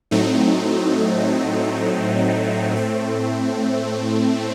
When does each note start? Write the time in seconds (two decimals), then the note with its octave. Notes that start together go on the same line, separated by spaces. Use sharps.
0.11 A2 F#3 A3 C4 D#4
2.74 A2 A3 C4